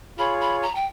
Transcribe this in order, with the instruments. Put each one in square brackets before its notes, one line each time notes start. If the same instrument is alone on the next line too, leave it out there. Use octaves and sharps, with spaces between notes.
[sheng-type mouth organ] F4 G#4 C#5 [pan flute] B5
[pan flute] B5
A#5
G5